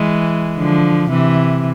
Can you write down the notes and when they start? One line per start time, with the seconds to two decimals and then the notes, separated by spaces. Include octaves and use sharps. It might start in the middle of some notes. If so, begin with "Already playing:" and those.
Already playing: E3 G#3
0.58 D3 F3
1.10 C3 E3